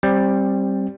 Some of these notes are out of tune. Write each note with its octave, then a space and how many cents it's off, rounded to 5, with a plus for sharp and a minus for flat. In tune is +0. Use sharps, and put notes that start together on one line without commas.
G3 +0 C4 +20